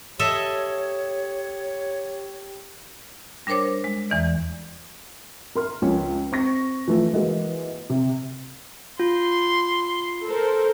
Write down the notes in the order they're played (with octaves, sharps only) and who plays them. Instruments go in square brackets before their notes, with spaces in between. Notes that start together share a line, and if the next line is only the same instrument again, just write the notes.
[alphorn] G4 [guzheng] A4 D#5 E5 [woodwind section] C#5
[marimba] G3 D4 A#4 C5 C#5 D6
G#3
E2 E3 D5
[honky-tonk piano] A#4 C6 F6
C#2 F3 C#4
C4 C#6 A#6
E3 F3 A3
E3 G#3 A#3 F#4
C3
[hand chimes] F4 [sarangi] C6
[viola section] A4 A#4 C5